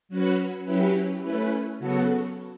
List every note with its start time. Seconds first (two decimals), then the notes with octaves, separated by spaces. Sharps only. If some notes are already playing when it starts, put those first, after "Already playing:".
0.09 F#3 C#4 F#4 B4
0.65 F#3 C#4 E4 G4 B4
1.22 A3 C#4 E4 B4
1.79 C#3 F#3 B3 F#4 A4